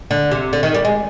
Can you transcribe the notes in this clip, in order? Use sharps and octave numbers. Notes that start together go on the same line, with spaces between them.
D3
C3
D3
D#3
G3
G#3